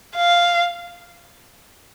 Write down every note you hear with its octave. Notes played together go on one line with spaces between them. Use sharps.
F5